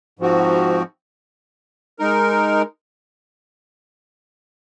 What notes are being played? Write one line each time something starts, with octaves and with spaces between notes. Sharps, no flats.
G#2 F3 C4 F#4
G#3 D#4 A#4